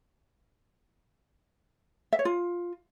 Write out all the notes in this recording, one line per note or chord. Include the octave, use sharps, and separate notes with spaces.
E5
C#5
F4